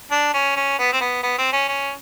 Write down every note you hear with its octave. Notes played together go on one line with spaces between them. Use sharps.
D4
C#4
C#4
B3
C4
B3
B3
C4
C#4
C#4